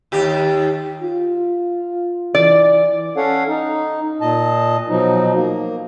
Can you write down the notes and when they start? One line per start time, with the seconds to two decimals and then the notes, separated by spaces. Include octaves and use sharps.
0.12 D#2 G4
1.02 F4
2.35 E3 D5
3.17 C#4 A4 C#5 F5 F#5
3.49 D#4
4.21 A#2 D#5 A5
4.89 B2 F3 F#3 D#4
5.36 A#3